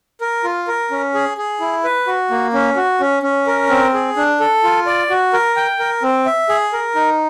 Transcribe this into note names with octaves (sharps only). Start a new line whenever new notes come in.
A#4
F4
A#4
C#4
G#4
G#4
E4
B4
F#4
A#3
C#4
F#4
C#4
C#4
A#4
C4
G#4
D4
A4
F4
D5
F#4
A#4
G5
A#4
C4
E5
G#4
A#4
D#4